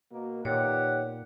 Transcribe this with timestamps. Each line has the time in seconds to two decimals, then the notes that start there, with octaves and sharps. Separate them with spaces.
0.12 B2 A#3
0.45 A#2 D#3 B3 G4 C#5 F#5